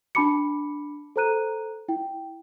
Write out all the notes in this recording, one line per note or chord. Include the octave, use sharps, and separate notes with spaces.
D4 A5 B5 D6 C#7
A4 C5 A#5 F#6 D#7
E4 G5